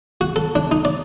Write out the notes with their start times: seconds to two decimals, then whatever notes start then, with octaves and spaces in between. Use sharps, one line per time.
0.21 F#4
0.36 A4
0.55 D4
0.71 D#4
0.85 D5